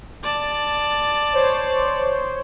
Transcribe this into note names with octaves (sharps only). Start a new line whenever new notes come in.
D5 A5
C5 C#5